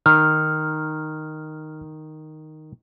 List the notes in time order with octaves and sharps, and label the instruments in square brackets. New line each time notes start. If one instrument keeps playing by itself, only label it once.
[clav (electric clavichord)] D#3 [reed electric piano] F6